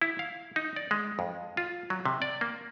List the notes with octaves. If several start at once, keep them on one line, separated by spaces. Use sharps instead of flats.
E4
F5
D#4
D5
G#3
F2
F4
F#3
C3
D5
A#3